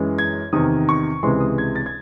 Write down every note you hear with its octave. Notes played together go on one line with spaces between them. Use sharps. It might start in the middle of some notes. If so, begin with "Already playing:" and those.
Already playing: F#2 E3 G#3
G#6
E2 C3 D#3 D#6
C#6
C#2 C3 E3 G#3 C6
D#6
G#6
A6
G#6